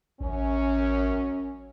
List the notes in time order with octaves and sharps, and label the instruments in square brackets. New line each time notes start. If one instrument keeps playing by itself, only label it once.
[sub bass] A1 [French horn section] F#2 C#4